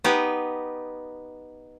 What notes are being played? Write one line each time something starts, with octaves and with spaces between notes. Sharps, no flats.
B3 D#4 G4 B4